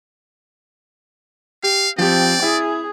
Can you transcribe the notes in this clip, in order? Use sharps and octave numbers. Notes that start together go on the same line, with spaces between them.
G4 F5
F3 C4 G4 D5
E4 G#4